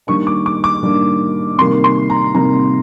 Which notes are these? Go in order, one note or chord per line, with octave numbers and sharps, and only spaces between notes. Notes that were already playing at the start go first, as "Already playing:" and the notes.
D#3 G3 A#3 D4 C#6
D6
D6
D6
D#3 G3 A#3 D4
C3 D#3 G3 A#3 C6
C6
A#5
C3 D#3 G3 A#3 A#5